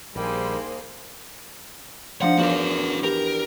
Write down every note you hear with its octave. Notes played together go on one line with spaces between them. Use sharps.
A#1 G3 A#3 D#4 G#4 C5
F3 D4 D#4 F#5
E2 F#4 A#4 D6
G4 A#4